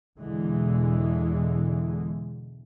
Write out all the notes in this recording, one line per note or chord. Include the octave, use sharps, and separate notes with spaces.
E2 B2 D3 E3 G#3